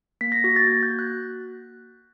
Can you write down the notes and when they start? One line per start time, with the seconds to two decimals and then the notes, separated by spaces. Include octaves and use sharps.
0.21 A#3 B6
0.32 A#6
0.44 F#4 A#6
0.56 A6
0.67 A#3 G#6
0.83 G6
0.90 F#4
0.99 F#6